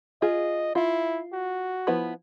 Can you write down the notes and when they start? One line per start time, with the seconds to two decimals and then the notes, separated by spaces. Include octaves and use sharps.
0.22 F4 G#4 D#5
0.75 E4 F4
1.33 F#4
1.87 F3 B3 E4